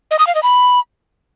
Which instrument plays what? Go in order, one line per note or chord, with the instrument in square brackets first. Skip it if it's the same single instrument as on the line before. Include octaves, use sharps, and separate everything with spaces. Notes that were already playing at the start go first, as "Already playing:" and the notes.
[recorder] D#5
D#6
F5
D#5
B5